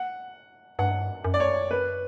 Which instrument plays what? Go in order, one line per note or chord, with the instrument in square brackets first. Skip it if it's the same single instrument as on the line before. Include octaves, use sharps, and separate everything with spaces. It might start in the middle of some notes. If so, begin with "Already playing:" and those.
Already playing: [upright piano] F#5
[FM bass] G2 [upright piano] F#5
[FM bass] F#2
[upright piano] D5
C#5
B4